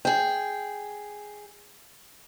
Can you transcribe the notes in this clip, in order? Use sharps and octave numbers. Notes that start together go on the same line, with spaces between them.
G#4 G5